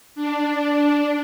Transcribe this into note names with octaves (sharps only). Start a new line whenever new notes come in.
D4